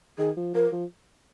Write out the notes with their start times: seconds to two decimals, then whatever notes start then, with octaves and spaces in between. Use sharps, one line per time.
0.18 D#3 G#4
0.37 F3
0.54 F3 A#4
0.72 F3